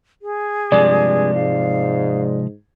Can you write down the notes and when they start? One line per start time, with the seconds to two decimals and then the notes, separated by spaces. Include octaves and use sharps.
0.22 G#4
0.72 G2 C3 F3 G#3 D5
1.34 G#2 F5